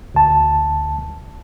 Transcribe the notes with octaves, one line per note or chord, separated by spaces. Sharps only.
D2 A5